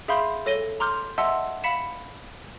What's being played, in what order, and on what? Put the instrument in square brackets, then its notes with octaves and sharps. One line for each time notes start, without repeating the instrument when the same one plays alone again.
[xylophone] G#4 E5 F5 B5 C6 G6
A4 C#5 A#6 D#7 G7
A#5 C6 D6 F6 G6
D#5 E5 F#5 A5 C6 E6
F5 B5 B6 C#7 E7